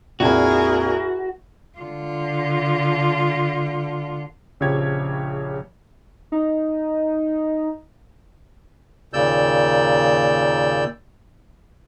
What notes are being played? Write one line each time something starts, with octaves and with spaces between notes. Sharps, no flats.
A#1 F2 A#2 E4 F#4 G#4 A#4
D3 F4
A#1 C#3 F3 G4 C#5 G#6
D#4
D#2 A#2 C#3 D5 E6 G6